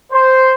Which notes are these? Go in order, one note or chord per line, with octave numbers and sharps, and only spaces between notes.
C5